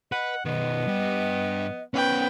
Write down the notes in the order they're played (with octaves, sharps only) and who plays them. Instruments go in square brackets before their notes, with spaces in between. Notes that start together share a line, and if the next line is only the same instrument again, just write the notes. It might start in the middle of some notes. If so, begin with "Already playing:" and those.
[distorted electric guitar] B4 [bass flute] D#5 [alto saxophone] F#5
[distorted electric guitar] B2 D#3 [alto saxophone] B3 [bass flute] D#5
[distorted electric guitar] G2 G4
[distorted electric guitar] B3 C#4 [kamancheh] B4 G5 [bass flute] F#5